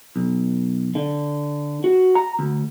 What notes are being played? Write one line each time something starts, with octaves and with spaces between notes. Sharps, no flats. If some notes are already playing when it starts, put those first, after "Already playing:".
B1
D3
F#4
A#5
D2